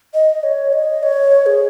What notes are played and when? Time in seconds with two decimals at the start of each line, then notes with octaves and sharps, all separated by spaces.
0.14 D#5
0.43 C#5
0.73 D#5
1.03 C#5
1.46 G#4